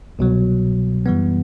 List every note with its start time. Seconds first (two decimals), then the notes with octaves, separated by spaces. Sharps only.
0.19 C2 B2 F#3
1.06 F#2 E3 G3 B3